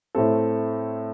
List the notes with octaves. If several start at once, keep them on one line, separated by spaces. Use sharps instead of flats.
A2 A3 C4 A4